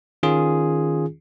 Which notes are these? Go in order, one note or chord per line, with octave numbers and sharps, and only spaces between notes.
D#3 C#4 F4 G#4